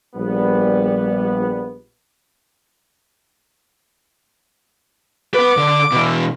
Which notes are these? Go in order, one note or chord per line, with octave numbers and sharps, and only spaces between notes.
A#1 G3 B3
B4 F#5 D6
D3
B2 E3